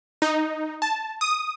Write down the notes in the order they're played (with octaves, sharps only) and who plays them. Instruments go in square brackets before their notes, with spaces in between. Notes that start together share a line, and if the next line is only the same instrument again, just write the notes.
[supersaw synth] D#4
A5
D#6